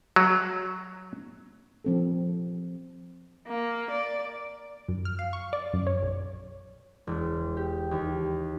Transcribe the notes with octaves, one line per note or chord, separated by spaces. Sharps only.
F#3
F3 C4 A4
A#3
D5
F#2
F6
F5
C#6
D5
F#2
C#5
B1
E1
G4
D#2